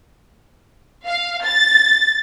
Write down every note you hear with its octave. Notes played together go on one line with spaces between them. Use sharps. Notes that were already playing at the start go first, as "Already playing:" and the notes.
F5
A6